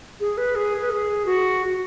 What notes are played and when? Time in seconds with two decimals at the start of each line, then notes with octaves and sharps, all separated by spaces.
0.20 G#4
0.38 B4
0.55 G#4
0.81 B4
0.91 G#4
1.26 F#4